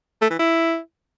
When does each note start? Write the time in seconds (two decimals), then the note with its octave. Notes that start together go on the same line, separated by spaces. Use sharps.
0.22 A3
0.30 E3
0.39 E4